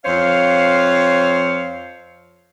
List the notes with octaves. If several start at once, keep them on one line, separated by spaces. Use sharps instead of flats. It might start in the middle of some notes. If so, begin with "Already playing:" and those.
F2 C5 C#5 F5